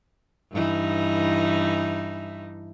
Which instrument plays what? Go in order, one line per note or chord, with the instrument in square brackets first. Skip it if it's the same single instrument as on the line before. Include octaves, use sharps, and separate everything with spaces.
[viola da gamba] G2 E3 D#4